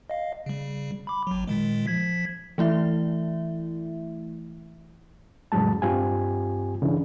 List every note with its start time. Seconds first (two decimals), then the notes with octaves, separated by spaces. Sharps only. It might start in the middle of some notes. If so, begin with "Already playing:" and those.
0.10 D#5 F5
0.46 C#3 G3
1.07 B5 D6
1.27 G#1 F#3
1.47 A#2 D#3 G#3
1.87 F3 G#6 B6
2.58 E3 A3 E4 E5
5.52 F2 A2 C#3 F#3 G#3 A5
5.82 G2 C4 F4 G4 G#5
6.82 C#3 E3 D4